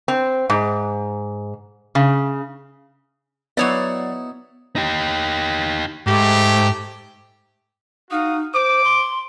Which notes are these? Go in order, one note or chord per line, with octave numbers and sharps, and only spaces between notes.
C4
G#2
C#3
F#3 B3 D#4 E4 C#5 D5 F#5
D#4 G4
G#2 A3 G4
D#4 F#4 F5 D#6
C5 D6
C6